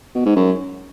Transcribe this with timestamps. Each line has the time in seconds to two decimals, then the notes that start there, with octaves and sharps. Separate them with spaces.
0.15 B2
0.25 G#2
0.36 F#2